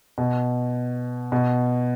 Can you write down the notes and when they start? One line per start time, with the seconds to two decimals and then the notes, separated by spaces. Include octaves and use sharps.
0.18 B2
1.32 B2